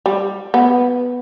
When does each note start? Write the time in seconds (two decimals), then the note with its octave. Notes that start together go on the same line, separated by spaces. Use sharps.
0.06 G3
0.54 B3